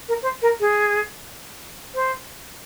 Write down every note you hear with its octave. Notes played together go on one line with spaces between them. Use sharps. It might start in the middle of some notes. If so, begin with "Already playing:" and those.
A#4
C5
A#4
G#4
C5